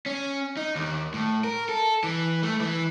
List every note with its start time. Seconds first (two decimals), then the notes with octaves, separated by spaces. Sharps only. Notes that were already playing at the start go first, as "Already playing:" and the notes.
0.06 C#4
0.57 D#4
0.76 D#2
1.14 A2
1.44 A#4
1.69 A4
2.04 E3
2.43 A3
2.61 E3